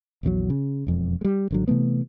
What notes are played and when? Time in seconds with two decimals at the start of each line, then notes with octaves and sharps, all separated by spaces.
0.23 A#1 E2 D3 F#3
0.50 C#3
0.87 E1 F2
1.21 G3 G#3
1.51 G#1 D3 F#3
1.68 C3 E3 A3 B3